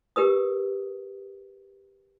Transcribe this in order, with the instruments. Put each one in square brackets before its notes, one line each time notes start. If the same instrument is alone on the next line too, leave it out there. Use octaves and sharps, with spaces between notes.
[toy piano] G4 A#4 B4 D#6